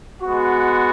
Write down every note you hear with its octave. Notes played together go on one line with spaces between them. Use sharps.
G#3 B3 F#4